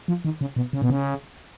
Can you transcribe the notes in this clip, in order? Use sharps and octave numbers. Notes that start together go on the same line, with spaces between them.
F3
D#3
C#3
B2
C#3
B2
C#3